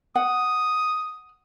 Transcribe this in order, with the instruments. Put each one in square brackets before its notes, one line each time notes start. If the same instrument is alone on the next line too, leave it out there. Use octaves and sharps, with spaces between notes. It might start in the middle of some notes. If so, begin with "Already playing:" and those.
[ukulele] F#5 [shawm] D#6